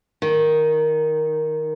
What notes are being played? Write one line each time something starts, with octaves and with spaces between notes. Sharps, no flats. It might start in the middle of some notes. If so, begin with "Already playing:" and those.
D#3